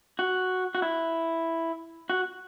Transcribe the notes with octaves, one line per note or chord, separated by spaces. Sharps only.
F#4
F#4
E4
F#4